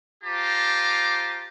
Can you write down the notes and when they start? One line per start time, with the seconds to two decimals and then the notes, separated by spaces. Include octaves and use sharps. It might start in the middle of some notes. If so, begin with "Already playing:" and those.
0.24 F4 G4 C5 A5 A#5 D6